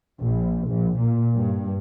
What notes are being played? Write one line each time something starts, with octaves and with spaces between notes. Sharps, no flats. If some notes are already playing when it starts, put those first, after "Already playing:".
A#1
A#1
A#2
G2